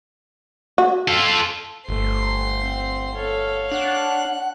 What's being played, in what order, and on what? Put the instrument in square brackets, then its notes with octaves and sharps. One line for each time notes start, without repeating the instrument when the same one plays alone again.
[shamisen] F#4
[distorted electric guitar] F4 A4
[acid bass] G1 [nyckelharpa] A3 [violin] C5 C6
[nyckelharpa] C4
[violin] A4 [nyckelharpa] C#5 F5
[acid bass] D4 [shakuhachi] F#5 [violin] F#6